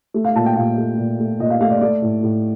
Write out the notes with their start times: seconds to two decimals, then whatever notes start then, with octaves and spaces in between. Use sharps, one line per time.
0.14 A3
0.25 F5
0.35 A#2 A5
0.46 G5
0.56 A#2 F5
0.77 A3
0.98 A#2
1.19 A3
1.39 A#2 D#5
1.50 F5
1.61 A3 F5
1.71 D5
1.81 A3 D5
2.02 A2
2.23 A2